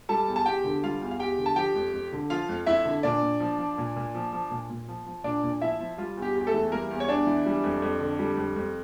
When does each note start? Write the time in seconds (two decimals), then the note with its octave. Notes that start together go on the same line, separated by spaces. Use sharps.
0.09 G3 A4 A5
0.27 E2
0.36 A5
0.46 E2 G4 G5
0.64 D3
0.83 G3 F4 F5
1.01 E2
1.11 F5
1.19 E2 G4 G5
1.38 D3
1.46 A5
1.56 F3 G4 G5
1.75 F2
1.93 F2
2.12 D3
2.30 F3 F4 F5
2.49 F2
2.66 F2 E4 E5
2.85 D3
3.03 A#2 D4 D5
3.22 A#2
3.40 F3
3.58 F3
3.78 A#2
3.96 A#2
4.15 F3
4.33 F3
4.51 A#2
4.70 A#2
4.88 F3
5.06 F3
5.24 A#2 D4 D5
5.44 A#2
5.61 F3 E4 E5
5.80 F3
5.98 G3 F4
6.17 E2
6.22 G4
6.35 E2
6.41 G4
6.47 A3 A4
6.54 E3
6.72 G3 A#3 A#4
6.90 E2
7.00 C#5
7.08 E2 D4 D5
7.26 E3
7.46 G3
7.64 F2
7.82 F2
8.00 D3
8.19 G3
8.37 F2
8.56 F2